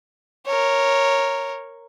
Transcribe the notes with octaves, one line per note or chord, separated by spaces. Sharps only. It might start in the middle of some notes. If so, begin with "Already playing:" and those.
A#4 C#5